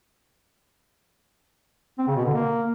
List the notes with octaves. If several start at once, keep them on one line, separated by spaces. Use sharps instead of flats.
C4
C#3
B2
D3
A#3